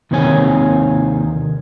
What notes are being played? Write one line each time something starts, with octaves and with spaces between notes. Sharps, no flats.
D#2 C3 D#3 C4 C#5 G#5